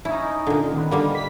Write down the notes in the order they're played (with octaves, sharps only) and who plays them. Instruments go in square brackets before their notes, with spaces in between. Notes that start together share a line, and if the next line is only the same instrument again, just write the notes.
[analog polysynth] C#4 D#4 [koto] E4
[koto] A#2 D3
[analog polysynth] D#3 B3
[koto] D3 G3 A#3
[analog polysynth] B6